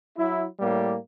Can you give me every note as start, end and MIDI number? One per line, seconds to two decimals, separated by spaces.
0.17 0.44 54
0.17 0.44 64
0.59 0.95 45
0.59 0.95 55
0.59 0.95 58